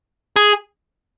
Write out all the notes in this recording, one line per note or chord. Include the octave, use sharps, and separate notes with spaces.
G#4